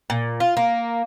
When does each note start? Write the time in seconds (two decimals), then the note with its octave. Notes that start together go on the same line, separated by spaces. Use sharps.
0.10 A#2
0.40 F4
0.57 A#3